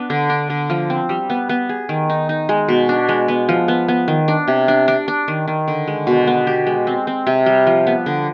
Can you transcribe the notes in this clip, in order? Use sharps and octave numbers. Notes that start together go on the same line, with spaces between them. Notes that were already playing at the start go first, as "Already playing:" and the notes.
Already playing: B3 D4
D3
D4
D3
F3
C4
G3
B3
B3
G#4
D#3
D#4
D#4
G#3
B2
D4
G#3
B3
F3
B3
B3
D#3
D4
C3
D4
D4
D4
D#3
D#3
D3
G#3
B2
B3
G4
G#3
C4
C4
C3
G3
F3
B3
D3